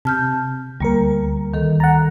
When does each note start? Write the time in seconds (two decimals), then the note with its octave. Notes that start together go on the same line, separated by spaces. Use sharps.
0.05 C3 A5 F6 G6
0.80 D2 G3 A#3 A#4
1.54 D#3 A4
1.80 F#5 A#5 A6